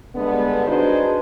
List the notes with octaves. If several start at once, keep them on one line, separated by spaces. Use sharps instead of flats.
G2 D3 G#3 B3
D4 D#4 F#4 G#4 B4 C5